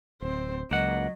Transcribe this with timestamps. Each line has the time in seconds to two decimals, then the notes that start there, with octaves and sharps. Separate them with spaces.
0.22 D1 C4 C5
0.71 C#2 F#3 A#3 D#5 F#5